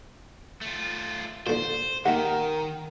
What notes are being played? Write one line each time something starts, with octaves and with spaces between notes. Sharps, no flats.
A3 F4
A#2 D3 C5
D#2 D#3 A#4 E5 F#5